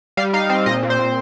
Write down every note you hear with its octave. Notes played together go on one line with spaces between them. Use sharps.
G3 F5
D#4 F5
C4 F5
A#2 D#5
A#2
C5
A#2